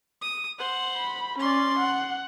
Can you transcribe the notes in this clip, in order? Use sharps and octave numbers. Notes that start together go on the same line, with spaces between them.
D#6
C5 F#5
B5
C#4 D5 C6
F#5